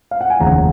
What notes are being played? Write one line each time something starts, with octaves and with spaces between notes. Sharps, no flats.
F5
F#5
G#5
F1 D#2 C#3 F3 F#5 A#5